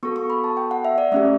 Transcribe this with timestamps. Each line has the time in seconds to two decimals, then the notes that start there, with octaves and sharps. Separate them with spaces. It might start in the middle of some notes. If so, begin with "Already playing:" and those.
0.03 B3 F#4 A4 C#6
0.16 C#6
0.30 B5
0.44 A5
0.57 G5
0.71 F#5
0.85 E5
0.98 D5
1.12 A3 C#4 G4 E5